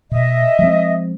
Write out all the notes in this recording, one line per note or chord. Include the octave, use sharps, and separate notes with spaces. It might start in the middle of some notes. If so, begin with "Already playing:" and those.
B2 D#5 E5
F3 G#3 C4